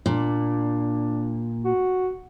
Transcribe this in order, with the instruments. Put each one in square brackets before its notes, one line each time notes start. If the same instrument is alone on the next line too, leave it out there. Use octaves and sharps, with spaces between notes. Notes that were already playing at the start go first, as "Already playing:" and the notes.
[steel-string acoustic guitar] A#2 [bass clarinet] D4
[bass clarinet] F#4